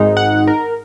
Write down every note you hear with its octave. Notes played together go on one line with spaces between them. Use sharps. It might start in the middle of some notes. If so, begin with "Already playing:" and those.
Already playing: G#1 G#2 G#3 D#4
F#5
A#4